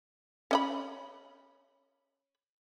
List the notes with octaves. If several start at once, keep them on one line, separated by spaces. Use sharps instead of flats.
C#4 D#5 B5